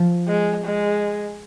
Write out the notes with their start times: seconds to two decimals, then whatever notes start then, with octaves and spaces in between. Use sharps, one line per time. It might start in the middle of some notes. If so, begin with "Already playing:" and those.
Already playing: F3
0.28 G#3
0.65 G#3